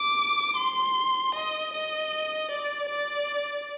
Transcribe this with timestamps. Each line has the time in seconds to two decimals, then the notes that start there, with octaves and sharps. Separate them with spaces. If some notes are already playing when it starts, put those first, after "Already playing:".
Already playing: D6
0.57 C6
1.35 D#5
1.74 D#5
2.51 D5
2.90 D5